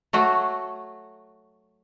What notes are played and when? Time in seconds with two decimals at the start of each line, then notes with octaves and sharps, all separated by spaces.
0.13 F#3 A3 F#4